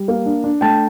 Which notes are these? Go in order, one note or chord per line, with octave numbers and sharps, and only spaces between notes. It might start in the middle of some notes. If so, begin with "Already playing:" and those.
Already playing: G3
A#3
D4
D4
A3 G5 A5